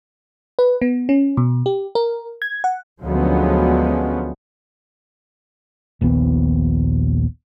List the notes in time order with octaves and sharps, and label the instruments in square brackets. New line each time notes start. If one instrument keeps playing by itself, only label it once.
[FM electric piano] B4
B3
C#4
B2
G4
A#4
G#6
F#5
[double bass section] D2 F3 F#3 G#3 B3 C#4
[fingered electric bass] D#1 A#1 D#2 B3